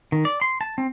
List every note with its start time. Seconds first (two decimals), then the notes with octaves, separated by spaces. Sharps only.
0.12 D#3
0.25 D5
0.41 C6
0.61 A5
0.78 C4